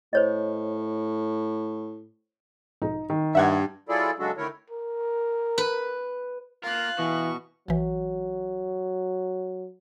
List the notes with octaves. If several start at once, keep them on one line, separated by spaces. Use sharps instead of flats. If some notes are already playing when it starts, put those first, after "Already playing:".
A2 C5 C#5 D#5
B1 F2 G#2 D#4
D#3
G2 E5 F#5 G#6
F#3 E4 F4 G#4 A4 D5
C#3 F#3 G#3 D4 F#4 A4
D3 D#3 A3 E4 A#4 C#5
A#4
B4
A#3 F4 A#4 F5 F#6
B2 E3 C#6
A#1 E3 F#3